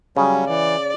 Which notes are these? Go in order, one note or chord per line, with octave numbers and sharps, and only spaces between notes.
C#3 F#3 G3 C#4
E3 D5